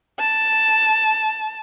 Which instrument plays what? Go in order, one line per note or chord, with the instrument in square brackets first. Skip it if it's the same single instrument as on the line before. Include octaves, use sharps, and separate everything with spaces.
[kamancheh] A5